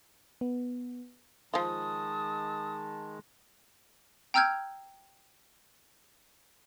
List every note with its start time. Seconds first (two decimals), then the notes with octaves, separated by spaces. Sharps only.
0.41 B3
1.54 D#3 F3 G#3 F4 A5 D#6
4.34 G5 A#5 E6 F6 G6 G#6